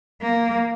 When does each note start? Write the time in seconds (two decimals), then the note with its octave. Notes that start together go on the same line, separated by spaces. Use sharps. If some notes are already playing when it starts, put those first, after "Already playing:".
0.22 A#3